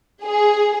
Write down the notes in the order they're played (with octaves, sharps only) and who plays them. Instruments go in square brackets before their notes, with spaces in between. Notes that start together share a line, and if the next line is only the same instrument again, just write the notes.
[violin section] G#4